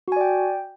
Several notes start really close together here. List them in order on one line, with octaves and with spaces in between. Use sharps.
F#4 G#5 D5 G5